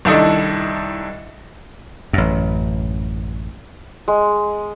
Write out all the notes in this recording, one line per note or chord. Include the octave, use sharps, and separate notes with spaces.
C2 D#3 D4 E4 A4 D#5
A1 F#2
G#3